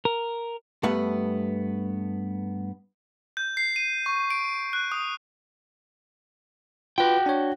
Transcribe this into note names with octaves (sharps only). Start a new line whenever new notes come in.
A#4
G2 A3 B3 F#5
G6
C7
D#7
C#6
D7
F#6
D#6
F4 F#4 B4 G5
D4 C#5